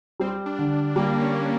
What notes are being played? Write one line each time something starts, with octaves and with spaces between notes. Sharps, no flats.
G3 C4
D4
D3
G3 A#3
C#4